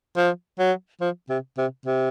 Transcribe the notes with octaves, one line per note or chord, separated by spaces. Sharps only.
F3
F#3
F3
C3
C3
C3